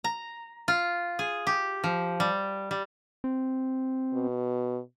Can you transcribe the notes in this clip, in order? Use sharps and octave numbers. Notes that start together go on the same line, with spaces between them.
A#5
F4
G#4
G4
F3
G3
G3
C4
B2